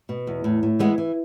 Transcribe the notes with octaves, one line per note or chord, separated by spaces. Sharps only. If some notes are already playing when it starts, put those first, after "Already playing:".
B2
E2
A2
A2
E3 G#3 B3
E3